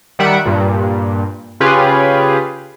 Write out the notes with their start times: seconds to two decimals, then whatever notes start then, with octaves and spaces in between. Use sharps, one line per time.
0.19 D#3 G3 E5 F#5 D7
0.46 G2 A#2
1.60 C#3 C#4 F4 G4 G#4 B4